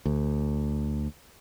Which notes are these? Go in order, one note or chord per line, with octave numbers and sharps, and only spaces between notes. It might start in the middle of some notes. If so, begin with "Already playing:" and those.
D2